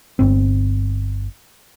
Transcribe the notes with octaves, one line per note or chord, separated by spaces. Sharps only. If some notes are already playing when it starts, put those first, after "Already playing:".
G1 C4